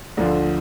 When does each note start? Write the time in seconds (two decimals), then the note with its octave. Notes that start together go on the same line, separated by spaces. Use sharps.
0.17 D2 D3 F3